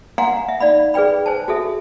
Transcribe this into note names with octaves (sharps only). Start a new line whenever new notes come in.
F5 F#5 G#5 A#5 C6
E5
D#4 D5 F5 B5
G#4 B4 D5 G5 B5
C5 G#5 A5
F#4 G#4 A4 E5